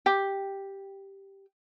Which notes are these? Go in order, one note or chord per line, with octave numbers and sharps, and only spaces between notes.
G4 G5